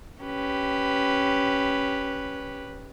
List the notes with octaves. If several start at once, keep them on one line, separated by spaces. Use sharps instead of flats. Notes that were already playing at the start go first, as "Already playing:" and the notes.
C#4 G4 B4